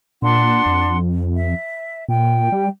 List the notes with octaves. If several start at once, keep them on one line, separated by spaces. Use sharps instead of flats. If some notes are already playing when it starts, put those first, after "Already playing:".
A#2 D4 F#5 C6
F2
E5
A#2 G5
G3